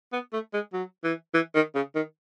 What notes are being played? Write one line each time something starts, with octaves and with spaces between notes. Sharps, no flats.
B3
A3
G#3
F#3
E3
E3
D#3
C#3
D#3